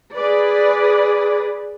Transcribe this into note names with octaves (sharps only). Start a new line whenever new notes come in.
G#4 B4 D5